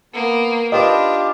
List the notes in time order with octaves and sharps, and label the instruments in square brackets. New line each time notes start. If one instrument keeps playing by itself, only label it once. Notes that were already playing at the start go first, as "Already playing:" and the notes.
[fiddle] A#3 [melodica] B3
[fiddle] D4 [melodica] F4 G4 [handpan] B4 D#5